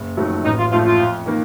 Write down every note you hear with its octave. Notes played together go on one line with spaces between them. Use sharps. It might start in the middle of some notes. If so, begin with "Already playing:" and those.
Already playing: F#1
F2 D#3 F#3 A3
A1 D#4
F4
A2 F3 A3 C4 F4
F4
F2
D#3 A#3